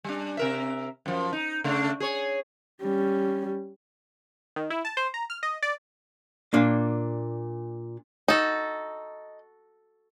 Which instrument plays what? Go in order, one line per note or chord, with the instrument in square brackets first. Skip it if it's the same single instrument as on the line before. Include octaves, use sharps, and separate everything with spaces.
[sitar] G3 D4
C3 A#4 E5
F#2 F3
D#4
C#3 A3 D4
G#4 C#5
[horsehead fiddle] G3 C#4
[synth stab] D#3
E4
A5
C5
A#5
F6
D#5
D5
[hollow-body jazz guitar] A#2 D4 F5
[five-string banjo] D#4 [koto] F#4 A4